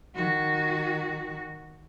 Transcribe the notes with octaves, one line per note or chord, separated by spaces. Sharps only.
D#3 F#4